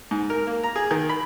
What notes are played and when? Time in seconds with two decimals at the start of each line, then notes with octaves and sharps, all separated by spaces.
0.11 G#2
0.30 A#4
0.47 A#3
0.64 A#5
0.76 G#4
0.91 D#3
1.09 B5